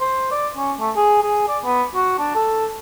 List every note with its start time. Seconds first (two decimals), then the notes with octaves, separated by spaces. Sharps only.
0.01 C5
0.32 D5
0.57 C#4
0.80 A3
0.96 G#4
1.23 G#4
1.48 D5
1.65 B3
1.95 F#4
2.19 D4
2.35 A4